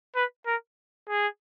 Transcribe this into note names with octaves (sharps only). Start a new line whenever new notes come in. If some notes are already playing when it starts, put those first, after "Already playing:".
B4
A#4
G#4